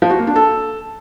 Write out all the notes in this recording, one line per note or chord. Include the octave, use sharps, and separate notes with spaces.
F3
F#4
A#3
D4
A4